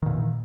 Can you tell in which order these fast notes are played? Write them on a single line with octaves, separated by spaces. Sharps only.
D#3 A#2 E3